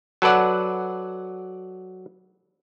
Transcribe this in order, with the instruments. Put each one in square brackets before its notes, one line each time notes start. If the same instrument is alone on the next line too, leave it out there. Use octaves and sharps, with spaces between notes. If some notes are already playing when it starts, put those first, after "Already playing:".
[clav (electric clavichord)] F#3 A4 B4 D5 F#5